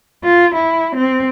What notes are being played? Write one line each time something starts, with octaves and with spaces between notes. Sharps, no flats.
F4
E4
C4